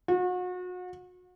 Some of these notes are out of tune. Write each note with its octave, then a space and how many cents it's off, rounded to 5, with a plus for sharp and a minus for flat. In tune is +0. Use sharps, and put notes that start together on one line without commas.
F#4 -35